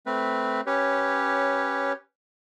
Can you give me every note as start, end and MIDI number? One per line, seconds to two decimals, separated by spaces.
0.06 0.61 57
0.06 0.61 60
0.06 0.61 71
0.66 1.93 61
0.66 1.93 67
0.66 1.93 71
0.66 1.93 73